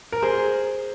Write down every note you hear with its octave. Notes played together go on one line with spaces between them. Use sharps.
A#4
G#4 C5